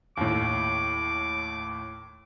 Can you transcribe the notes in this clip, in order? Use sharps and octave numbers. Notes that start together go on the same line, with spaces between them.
D#2 A2 D6